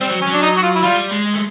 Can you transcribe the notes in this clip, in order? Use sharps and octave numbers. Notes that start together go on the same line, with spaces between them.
G3 C4
F#3
C#4
F#3
D4
D#4
F#4
F4
E4
G3 F4
G#3
A3